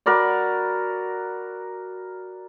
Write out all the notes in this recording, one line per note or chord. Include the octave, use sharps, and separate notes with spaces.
F#4 A#4 D5 B5